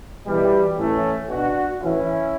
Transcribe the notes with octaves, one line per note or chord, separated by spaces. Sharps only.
B2 E3 G3
A2 E3 A3 C#4
B2 D4 F#4
A2 E3 C#4 E4